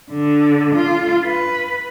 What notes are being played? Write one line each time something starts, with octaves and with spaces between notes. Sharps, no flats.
D3
F4
B4